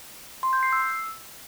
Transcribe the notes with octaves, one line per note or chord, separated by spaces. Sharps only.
C6
G6
C7
E6